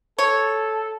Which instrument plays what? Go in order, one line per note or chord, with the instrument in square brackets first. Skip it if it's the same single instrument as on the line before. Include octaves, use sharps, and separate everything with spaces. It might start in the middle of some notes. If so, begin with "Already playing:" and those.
[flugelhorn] A4 [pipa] C#5